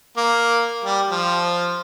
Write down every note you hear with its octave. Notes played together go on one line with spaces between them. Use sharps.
A#3
G3
F3